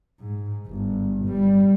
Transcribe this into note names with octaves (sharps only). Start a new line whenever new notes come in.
G#2
G1
G3